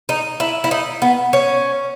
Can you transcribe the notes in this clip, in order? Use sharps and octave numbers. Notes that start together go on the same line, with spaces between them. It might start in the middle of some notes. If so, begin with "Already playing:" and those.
D#4
E4
E4
D#4
B3
C#4